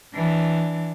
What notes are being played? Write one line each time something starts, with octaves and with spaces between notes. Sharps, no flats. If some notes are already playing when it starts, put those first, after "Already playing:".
E3 D4